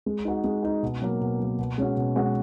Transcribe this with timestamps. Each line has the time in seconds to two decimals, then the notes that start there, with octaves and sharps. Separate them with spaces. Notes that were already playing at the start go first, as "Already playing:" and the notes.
0.06 G#3
0.25 D#4 F#4
0.44 G#3
0.63 D#4 F#4
0.83 B2
1.02 F#3 A#3
1.21 B2
1.40 F#3 A#3
1.59 B2
1.78 G#3 C#4 F#4
1.97 B2
2.16 G#3 C#4 F#4